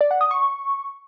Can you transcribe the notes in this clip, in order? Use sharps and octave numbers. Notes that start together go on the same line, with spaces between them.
D5
F#5
D#6
C#6